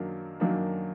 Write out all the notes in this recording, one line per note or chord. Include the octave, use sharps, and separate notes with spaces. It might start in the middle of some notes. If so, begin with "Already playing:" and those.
Already playing: F#2 D#3 F#3 A#3 D4
F#2 D#3 F#3 A#3 D4